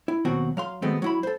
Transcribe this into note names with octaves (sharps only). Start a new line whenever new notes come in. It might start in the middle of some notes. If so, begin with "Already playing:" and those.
E4
D#2 B2 F#3 C4 F#4 F#5
F#3 F5 C6
D#3 F#3 G#3 A3 B3 C4
F#3 E4 B5
A4 C5